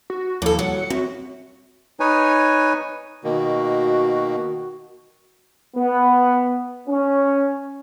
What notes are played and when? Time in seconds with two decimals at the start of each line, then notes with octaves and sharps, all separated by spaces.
0.10 F#4
0.42 D#2 A2 F3 A#3 A4
0.59 F#3 G3 F#5
0.76 C#7
0.90 F#2 C4 F#4
2.00 D#4 B4 C#5 G#5
3.24 B2 D#3 A#3 F#4
5.76 B3
6.88 C#4